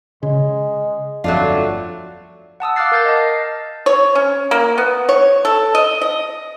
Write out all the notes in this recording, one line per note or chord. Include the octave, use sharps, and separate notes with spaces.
C#3 G#3
G1 F2 F#3 A3 D4 F4
F#5 A5 D#6 E6
F5 D6 F6 F#6 A6 C7
A#4 G6 A6
D#5 A5
C7
C#5
C#4
A#3
B3
C#5
A4
D#5
D#5